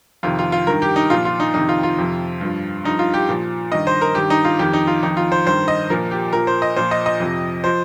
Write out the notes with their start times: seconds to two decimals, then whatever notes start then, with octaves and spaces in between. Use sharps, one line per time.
0.23 F2 C3 D#3 F4
0.39 F4
0.52 F4
0.66 G2 D#3 A#4
0.82 G4
0.96 D#4
1.10 A#2 F3 F4
1.25 F4
1.40 D#4
1.54 F2 C3 D#3 D#4
1.69 F4
1.83 F4
1.98 F2 C3 F3
2.41 G2 F3
2.84 G2 F3 D#4
2.99 F4
3.14 G4
3.29 A#2 F3
3.72 G2 D#3 D#5
3.87 C5
4.02 A#4
4.15 G2 D#3 G4
4.30 D#4
4.45 F4
4.59 F2 D#3 G4
4.73 D#4
4.87 F4
5.02 F2 D#3 D#4
5.17 F4
5.32 C5
5.46 G2 D#3 C5
5.68 D#5
5.90 A#2 F3 A#4
6.11 G4
6.33 A#2 F3 A#4
6.47 C5
6.62 D#5
6.76 A#2 F3 C5
6.91 D#5
7.06 D#5
7.20 F2 C3 F3
7.64 F3 C5